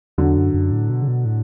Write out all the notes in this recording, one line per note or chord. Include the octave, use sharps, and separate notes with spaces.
E2 D3 F#3
F#2
F#2
A2
B2
C#3
B2
A2